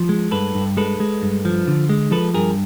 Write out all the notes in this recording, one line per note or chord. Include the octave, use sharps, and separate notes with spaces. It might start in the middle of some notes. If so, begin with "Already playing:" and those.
Already playing: F3
G#3
G2 A4 B4
G2
G#3 A4 B4
G#3
G2
F3
D3
G#3
F3 A4 B4
G2 G#4 A#4